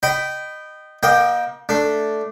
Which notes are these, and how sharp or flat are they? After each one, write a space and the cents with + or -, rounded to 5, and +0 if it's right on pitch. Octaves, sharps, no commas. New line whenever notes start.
D#5 -20 G5 -15 B5 +10
A#3 +40 D#5 +0 G5 +0
A3 +0 D4 +0